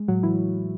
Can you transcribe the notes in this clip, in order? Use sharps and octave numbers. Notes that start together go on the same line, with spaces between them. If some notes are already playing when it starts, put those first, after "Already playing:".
Already playing: G#3
A2 F#3 F#4
E3 E4